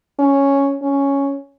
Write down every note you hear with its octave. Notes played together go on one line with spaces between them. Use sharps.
C#4
C#4